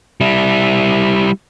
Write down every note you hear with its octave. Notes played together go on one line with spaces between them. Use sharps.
G3 E4